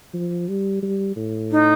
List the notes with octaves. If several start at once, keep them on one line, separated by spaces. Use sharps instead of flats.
F3
G3
G3
A2
D#4